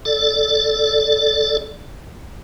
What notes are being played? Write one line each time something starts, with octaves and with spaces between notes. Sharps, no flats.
A4 D5